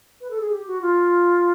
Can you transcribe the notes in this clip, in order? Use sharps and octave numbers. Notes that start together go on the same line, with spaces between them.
B4
A4
G#4
G4
F#4
F4